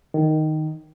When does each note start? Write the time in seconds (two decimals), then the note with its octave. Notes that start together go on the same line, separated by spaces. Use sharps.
0.14 D#3